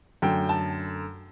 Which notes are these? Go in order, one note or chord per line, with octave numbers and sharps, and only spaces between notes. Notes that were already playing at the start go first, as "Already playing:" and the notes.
F#2 D3 A3 G5
A5